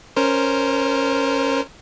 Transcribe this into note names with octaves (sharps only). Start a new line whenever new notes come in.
C#4 A#4 C5